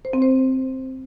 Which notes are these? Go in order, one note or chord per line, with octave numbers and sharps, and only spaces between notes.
C5
C4
C5